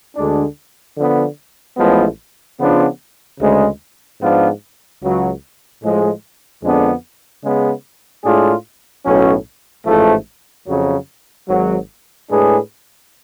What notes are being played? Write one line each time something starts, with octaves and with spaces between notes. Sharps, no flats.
D2 D3 G#3 D4
D3 F3 B3
A1 A2 F3 G#3 B3
C#3 F3 B3 D4 F4
D2 C#3 G#3
G#2 F3 B3 D4 F4
C#2 C#3 F#3
A2 F3 G#3
F2 D3 G#3 B3 D4
C#3 G#3 B3
A2 G#3 D4 F4 G#4
B1 A2 F#3 C#4
A1 G#2 F3 A3
F2 C#3 F#3
G#1 G#2 F#3
A2 G#3 D4 G#4 B4